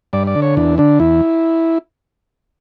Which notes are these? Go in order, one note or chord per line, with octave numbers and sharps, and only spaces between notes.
G2 D5
D5
D3
C#5
E2 D4
D3 D4
E2 E4